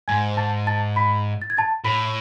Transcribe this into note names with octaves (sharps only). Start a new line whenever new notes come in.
G#2 G#5 G#6
A5 A6
A5 A6
B5 B6
A6
G#6
A5 A6
A2 B5 B6